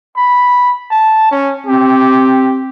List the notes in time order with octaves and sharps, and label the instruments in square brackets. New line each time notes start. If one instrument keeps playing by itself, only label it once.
[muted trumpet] B5
A5
C#4
[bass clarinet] C4 [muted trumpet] G4